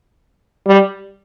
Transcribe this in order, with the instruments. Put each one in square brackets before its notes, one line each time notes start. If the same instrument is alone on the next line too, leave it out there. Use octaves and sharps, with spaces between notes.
[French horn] G3